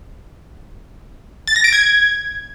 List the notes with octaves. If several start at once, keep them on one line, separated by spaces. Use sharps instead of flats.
A6
A#6
D7
G#6